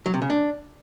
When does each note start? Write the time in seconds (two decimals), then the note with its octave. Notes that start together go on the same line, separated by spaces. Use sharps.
0.06 F#3
0.14 C3
0.22 C#3
0.30 D4